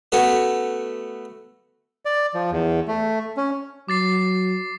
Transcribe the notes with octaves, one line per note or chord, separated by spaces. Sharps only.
A3 B3 C#4 F#4
D5
F3
E2
A3
C#4
F#3 D6 A6 C7